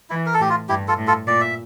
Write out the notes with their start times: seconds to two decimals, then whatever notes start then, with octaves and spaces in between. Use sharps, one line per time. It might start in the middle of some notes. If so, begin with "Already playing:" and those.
0.10 E3 E4
0.26 A#4
0.34 A4
0.40 A2 G4
0.50 F4
0.69 G2 E4 G4
0.88 F4 A4
0.98 A2
1.07 F4 A4
1.27 A#2 D5
1.41 E5